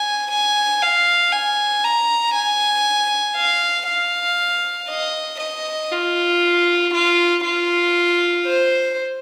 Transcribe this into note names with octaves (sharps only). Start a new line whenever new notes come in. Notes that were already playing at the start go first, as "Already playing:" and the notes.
Already playing: G#5
G#5
F5
G#5
A#5
G#5
F5
F5
D#5
D#5
F4
F4
F4
C5